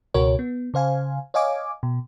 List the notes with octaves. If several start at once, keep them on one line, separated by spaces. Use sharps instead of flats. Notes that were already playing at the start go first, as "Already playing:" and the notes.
C#2 B2 F#4 A#4 C#5
B3
C#3 C5 F5 G#5
C#5 D#5 F5 G#5 D6
B2